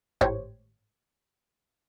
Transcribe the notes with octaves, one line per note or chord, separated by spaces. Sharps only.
G#1 A2 G4 C5 C#5